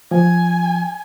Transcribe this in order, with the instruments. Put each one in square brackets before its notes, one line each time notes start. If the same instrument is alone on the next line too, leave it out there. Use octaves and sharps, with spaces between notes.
[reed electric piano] F3 [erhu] G#5